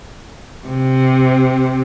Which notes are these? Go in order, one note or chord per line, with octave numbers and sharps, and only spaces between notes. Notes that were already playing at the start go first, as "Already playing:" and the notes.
C3